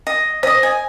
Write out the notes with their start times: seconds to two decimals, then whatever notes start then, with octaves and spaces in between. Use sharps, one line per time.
0.07 D#5
0.43 C5 D#5 D#6
0.63 G#5